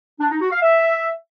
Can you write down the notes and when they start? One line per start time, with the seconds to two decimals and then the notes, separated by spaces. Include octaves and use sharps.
0.20 D4
0.31 D#4
0.41 F#4
0.52 F5
0.62 E5